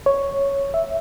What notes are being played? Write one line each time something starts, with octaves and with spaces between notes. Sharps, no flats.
C#5
E5